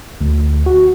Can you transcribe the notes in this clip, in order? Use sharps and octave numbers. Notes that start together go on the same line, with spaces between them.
D2
F#4